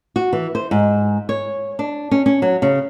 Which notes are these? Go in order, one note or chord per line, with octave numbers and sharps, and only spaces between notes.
F#4
E3
C5
G#2
C#5
D4
C#4
C#4
F#3
C#3